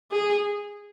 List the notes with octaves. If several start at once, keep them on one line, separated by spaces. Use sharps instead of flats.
G#4